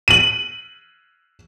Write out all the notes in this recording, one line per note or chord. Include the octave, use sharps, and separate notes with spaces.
D#7 F#7